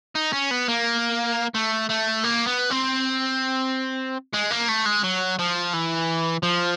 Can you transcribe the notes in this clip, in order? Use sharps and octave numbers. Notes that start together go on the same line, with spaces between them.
D#4
C#4
B3
A#3
A3
A3
A#3
B3
C4
G#3
A#3
A3
G#3
F#3
F3
E3
F3